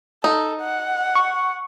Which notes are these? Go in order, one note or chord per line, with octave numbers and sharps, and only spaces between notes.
D#4 A4
F#5
C#6